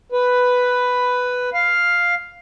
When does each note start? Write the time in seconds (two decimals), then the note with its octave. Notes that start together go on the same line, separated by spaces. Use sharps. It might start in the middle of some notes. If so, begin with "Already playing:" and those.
0.12 B4
1.54 F5